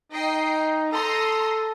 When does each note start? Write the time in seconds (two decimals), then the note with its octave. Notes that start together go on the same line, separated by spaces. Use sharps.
0.12 D#4 D#5 G5 C7
0.92 A4 A#5 C6 D#6